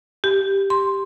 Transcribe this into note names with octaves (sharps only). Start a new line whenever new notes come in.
G4
C6